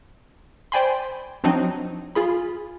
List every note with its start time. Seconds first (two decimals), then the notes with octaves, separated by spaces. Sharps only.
0.72 C5 D5 G5 G#5 B5 C6
1.44 F3 F#3 C4 D4 D#4
2.15 F4 G#4 B5